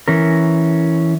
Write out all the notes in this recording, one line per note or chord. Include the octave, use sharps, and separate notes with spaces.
E3 C#4 A#4